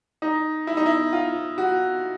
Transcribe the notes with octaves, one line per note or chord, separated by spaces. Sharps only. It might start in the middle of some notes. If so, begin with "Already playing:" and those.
D#4
E4
D#4
E4
F4
F#4